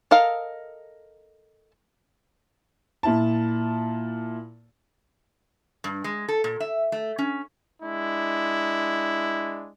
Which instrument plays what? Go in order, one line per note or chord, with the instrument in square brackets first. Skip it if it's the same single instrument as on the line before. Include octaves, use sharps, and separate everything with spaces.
[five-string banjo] A4 A#4 D#5 F5
[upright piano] A#2 E4 A5
[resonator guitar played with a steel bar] G2
G#3
A4
A#2
E5
A3
C#4
[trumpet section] G#3 D4 E4